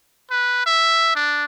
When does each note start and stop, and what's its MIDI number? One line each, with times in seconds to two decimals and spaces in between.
0.30 0.62 71
0.66 1.15 76
1.15 1.45 62